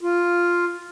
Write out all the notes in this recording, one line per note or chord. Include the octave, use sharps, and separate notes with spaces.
F4